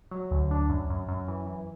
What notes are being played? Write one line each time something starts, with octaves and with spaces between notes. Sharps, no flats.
F#3
D2
D4
F#2
F#2
F#2
E3
E3